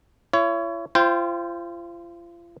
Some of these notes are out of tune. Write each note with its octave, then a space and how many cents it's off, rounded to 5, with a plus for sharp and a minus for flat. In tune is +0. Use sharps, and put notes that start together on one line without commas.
E4 +40 C#5 +20
F4 -35 C5 +0 G5 +0